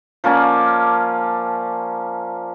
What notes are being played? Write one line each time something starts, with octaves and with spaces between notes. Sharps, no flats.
F3 A#3 C#4 D5